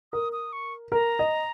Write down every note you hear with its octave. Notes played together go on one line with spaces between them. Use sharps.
A#4 D#6
D#6
C#6
A#4 A#5
D#5